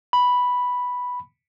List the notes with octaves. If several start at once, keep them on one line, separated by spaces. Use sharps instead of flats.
B5